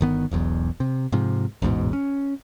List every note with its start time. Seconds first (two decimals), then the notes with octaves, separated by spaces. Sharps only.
0.01 G1 D#3 B3
0.31 E1 B1 E2
0.80 C3
1.12 G#2 C3 F3
1.62 A1 E2 G#2 B2
1.93 C#4